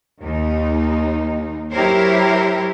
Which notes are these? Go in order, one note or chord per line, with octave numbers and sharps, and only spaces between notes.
D#2 D#4
F#3 E4 G4 A#4 C5 C#5